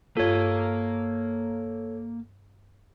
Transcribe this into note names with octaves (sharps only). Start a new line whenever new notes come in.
G2 A#3 F4 A4 C#5 F5